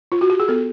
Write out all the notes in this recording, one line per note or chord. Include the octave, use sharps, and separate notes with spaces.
F4
F#4
G4
G#4
B3 A4